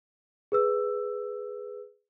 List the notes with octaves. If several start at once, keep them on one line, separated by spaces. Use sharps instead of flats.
G#4 B4 E6